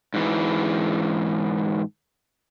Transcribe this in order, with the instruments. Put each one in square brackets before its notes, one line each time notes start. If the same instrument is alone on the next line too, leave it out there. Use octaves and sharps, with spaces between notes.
[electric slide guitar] G#2 E3